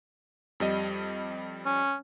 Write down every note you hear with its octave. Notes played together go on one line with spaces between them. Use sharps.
F2 G3 D#5
C#4